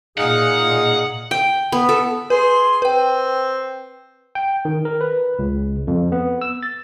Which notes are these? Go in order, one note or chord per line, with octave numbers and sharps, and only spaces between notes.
A#2 D#4 G#4 F5 F#5
G5
B3
A4
G#4 B4 C6
C4 B4 G5
G5
D#3
A#4
B4
C#2
F2
B3
E6
A6